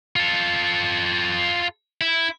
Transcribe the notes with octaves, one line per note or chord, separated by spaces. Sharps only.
F4 A4
E4